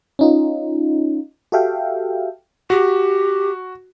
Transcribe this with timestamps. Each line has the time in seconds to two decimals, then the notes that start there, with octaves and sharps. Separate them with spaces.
0.19 C#4 D#4 F4
1.52 F#4 G4 A4 E5 F5 G5
2.70 F#4 G4